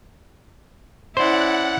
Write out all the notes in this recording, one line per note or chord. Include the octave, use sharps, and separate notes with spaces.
C#4 E4 C5 D5 F#5